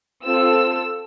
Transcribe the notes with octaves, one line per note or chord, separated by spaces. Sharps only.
C4 F4 A4 E6